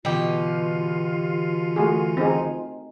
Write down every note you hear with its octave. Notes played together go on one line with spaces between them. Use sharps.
B2 D3 E3 F4 G4
A3 F#4 G#4
C4 D#4 G#4